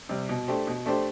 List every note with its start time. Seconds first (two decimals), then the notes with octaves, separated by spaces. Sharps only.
0.09 C3 G3
0.29 B2
0.48 A3 D4 G4 C5
0.67 B2
0.86 A3 D4 G4 C5